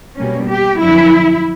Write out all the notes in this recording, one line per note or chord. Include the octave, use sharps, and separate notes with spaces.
B2 G3 A#3 C#4
G4
F2 D3 F#3 E4